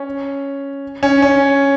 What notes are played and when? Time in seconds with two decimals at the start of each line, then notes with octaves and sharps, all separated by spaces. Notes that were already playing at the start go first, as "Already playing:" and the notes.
Already playing: C#4
1.03 C#4
1.22 C#4